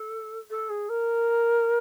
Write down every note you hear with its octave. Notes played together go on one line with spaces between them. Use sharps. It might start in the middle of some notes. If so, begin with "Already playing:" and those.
Already playing: A4
A4
G#4
A#4